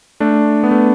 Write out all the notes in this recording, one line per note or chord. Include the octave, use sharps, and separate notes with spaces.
A3 D4
B3
A3